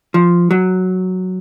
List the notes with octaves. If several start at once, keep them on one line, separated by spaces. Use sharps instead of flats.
F3
F#3